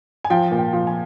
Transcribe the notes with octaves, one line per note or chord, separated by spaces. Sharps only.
G#5
F3 G5
A#2
G5
F3
G#5